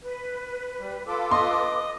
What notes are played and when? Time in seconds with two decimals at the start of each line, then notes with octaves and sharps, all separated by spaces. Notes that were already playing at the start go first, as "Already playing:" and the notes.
0.03 B4
0.79 G3
1.07 F4 A4 B4 D6
1.31 D#5 C6